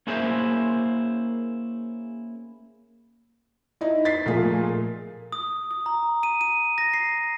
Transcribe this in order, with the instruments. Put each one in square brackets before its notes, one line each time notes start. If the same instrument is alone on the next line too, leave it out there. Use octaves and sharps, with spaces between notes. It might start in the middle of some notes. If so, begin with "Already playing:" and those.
[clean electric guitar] A#3 C#4 E4 G#4 C5 E5
[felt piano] D#4 E4
A6 B6 C7
A#2 F3 A3 A#3 F4 G#4
[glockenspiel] D#6
D#6
A#5
D#7
D#7
A#6
C7